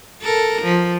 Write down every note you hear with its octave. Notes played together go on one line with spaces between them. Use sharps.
A4 A#4
F3